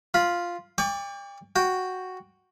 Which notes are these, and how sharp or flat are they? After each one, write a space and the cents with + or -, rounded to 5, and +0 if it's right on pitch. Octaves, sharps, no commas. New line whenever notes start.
F4 +0 B5 -20
D5 +0 G5 +35 C#6 +40
F#4 +0 G5 +0